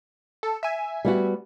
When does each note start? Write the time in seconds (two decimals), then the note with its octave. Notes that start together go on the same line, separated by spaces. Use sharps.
0.43 A4
0.63 E5 G#5
1.05 G3 B3 F#4